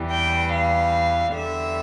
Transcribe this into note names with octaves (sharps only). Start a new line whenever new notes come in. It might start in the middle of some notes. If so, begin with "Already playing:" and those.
Already playing: E2 E3 G3
G5
F5
E2 D3 G3 E5